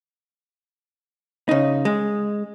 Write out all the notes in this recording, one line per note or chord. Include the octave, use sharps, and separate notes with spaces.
C#3 D#4
G#3